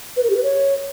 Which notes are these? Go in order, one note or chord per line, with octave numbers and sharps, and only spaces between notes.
B4
A#4
G4
B4
C#5